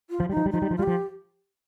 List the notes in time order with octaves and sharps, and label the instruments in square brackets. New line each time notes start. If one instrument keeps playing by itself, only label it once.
[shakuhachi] F4
[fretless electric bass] F3
[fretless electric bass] G3 [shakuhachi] D#4
[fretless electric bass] F3
G3
[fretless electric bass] F3 [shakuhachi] D#4
[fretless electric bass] G3
F3
[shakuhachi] F4
[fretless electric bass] G3
[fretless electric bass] F3 [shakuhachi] G4